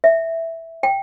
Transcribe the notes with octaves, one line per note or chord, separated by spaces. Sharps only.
E5
G5